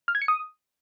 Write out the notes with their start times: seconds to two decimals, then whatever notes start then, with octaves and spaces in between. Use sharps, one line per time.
0.08 F6
0.15 G#6
0.22 C#7
0.28 D#6